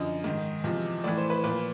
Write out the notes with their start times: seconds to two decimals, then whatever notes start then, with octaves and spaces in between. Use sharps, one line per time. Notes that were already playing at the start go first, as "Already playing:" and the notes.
Already playing: F#2 D3 F3 D#5
0.24 G#2 D#3
0.64 E2 C3 F3
1.04 A2 E3 D5
1.18 C5
1.30 B4
1.44 A#2 F3 B4